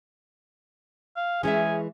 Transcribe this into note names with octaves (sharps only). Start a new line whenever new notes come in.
F5
E3 G#3 C#4 G#4 E5